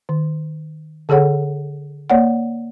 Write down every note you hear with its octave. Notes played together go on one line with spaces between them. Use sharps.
D#3
D3 G#4 A4 C#5 F#5
A#3 C#5 D5 F#5